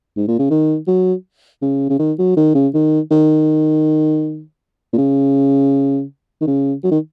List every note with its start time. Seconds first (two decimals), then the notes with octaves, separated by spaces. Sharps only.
0.17 G#2
0.28 A#2
0.39 C#3
0.50 D#3
0.87 F#3
1.62 C#3
1.90 C#3
1.99 D#3
2.19 F#3
2.37 D#3
2.55 C#3
2.74 D#3
3.11 D#3
4.93 A#2
4.98 C#3
6.41 D#3
6.47 C#3
6.84 F#3
6.91 D#3